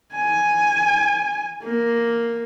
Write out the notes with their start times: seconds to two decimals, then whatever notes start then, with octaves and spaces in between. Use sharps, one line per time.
0.14 G#5
1.64 A#3